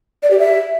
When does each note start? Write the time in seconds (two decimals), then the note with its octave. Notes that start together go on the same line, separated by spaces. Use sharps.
0.23 D5
0.31 G4
0.39 E5